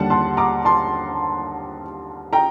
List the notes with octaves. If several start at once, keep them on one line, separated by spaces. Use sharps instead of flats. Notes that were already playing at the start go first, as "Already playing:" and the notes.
Already playing: D#2 D3 G3 F#5 A5
A5 C6
A#5 D6
A5 C6
G5 A#5